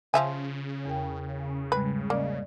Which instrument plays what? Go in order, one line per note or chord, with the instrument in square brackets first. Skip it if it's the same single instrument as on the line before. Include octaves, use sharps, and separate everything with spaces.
[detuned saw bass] C#3 [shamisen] F3 E5 G#5
[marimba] E2 A#4 G5
[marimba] G#2 G3 G#3 [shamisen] B4
[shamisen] A#3 [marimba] D5 D#5